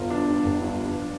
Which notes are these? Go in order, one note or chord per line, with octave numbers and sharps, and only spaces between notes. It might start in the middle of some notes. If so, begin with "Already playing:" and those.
Already playing: G1 F4
F3 D4
G2
G1
G2
F3